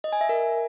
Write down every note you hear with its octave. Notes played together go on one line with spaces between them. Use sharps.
D#5
G#5
E5
A#4